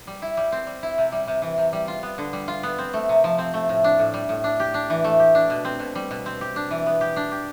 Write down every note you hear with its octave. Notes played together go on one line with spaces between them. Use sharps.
G3
E4
G3
C4
G3
E4
C3
G3
C3
E3
C3
G3
F4
B3
D3
G3
F4
B3
C4
A3
C3
F3
C4
A3
A2
D4
A2
G3
A2
D4
G4
D4
E3
A3
G4
D4
B2
C4
B2
G3
B2
C4
G4
D4
E3
B3
G4
D4
G4